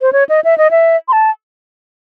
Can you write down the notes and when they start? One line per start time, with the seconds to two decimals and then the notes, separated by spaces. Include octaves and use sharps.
0.02 C5
0.13 C#5
0.29 D#5
0.44 E5
0.58 D#5
0.71 E5
1.08 C6
1.13 A5